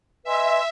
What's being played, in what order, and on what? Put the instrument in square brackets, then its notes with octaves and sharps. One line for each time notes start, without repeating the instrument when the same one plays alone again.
[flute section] B4 D#5 G#5 C6 [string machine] E5